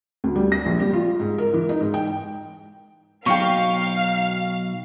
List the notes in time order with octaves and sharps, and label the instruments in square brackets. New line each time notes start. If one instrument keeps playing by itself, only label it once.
[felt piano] D2
G3
A#6
A#1
G3
F4
G#2
A#4
E3
D#4
G#2
G5
[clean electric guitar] B2 F#3 D#4 [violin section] F5 [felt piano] G5 C#6